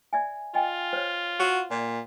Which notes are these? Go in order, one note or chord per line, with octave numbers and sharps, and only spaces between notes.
D5 E5 G#5
F4 D#5 G5 G#5
C5 C#5
F#4 F#5
A#2 D5